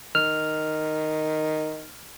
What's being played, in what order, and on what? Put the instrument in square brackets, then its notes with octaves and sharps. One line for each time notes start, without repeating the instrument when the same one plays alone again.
[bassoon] D#3 [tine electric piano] F6